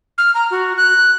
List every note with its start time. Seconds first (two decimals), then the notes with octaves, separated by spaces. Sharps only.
0.18 F6
0.34 A#5
0.51 F#4
0.77 F#6